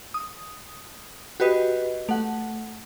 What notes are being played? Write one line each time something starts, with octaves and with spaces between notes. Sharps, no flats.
D#6
F#4 G4 B4 D#5
A3 F#5